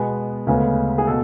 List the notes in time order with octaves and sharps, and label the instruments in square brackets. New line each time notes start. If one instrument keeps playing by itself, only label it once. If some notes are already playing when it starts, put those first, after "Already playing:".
Already playing: [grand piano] B2 G#3 B3
D2 C#3 G#3 B3
G#4
B2 A4